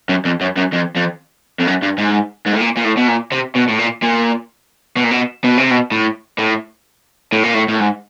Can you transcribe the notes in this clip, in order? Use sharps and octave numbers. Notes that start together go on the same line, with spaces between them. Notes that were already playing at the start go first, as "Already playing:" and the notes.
F#2
F2
F#2
F#2
F2
F2
F2
F#2
G2
G#2
G#2
A2
A#2
A#2
A2
B2
A#2
C3
B2
A2
A#2
A#2
B2
A#2
B2
B2
C3
B2
A2
A2
A2
A#2
A2
A2
G#2